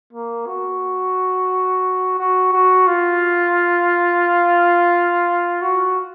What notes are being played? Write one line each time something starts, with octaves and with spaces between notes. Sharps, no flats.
A#3
F#4
F#4
F#4
F4
F#4